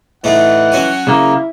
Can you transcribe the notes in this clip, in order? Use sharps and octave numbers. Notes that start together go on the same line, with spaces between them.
A2 E3 A3 D#4 F#5
F#3 C#4 G#5
C#3 A#3 E4